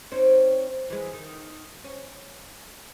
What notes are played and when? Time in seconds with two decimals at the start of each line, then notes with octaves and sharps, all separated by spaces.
0.12 C4 C#4 D#4
0.90 E3 G#3
1.13 D#3
1.84 C#4